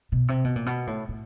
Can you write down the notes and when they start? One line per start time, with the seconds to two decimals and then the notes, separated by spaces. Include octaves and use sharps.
0.12 B2
0.28 C3
0.44 B2
0.56 A#2
0.66 B2
0.87 A2
1.09 A2